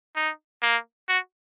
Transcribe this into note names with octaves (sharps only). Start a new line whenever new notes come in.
D#4
A#3
F#4